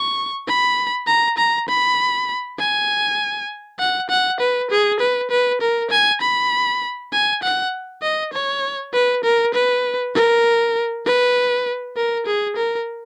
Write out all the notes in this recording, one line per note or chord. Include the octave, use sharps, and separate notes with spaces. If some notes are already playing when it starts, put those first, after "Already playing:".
Already playing: C#6
B5
A#5
A#5
B5
G#5
F#5
F#5
B4
G#4
B4
B4
A#4
G#5
B5
G#5
F#5
D#5
C#5
B4
A#4
B4
A#4
B4
A#4
G#4
A#4